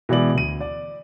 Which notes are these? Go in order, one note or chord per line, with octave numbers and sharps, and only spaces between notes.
B2 E3 G#3 D5 F#7
D2 D#7
D5